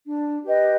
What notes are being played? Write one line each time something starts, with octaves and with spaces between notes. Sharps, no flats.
D4
G4 B4 D#5